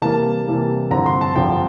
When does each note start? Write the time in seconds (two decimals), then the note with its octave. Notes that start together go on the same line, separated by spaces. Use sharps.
0.02 C3 E3 G3 A#3 A5
0.47 C3 E3 G3 A#3
0.90 G2 D3 F3 C4 A#5
1.06 C6
1.21 A5
1.35 G2 D3 F3 C4 G5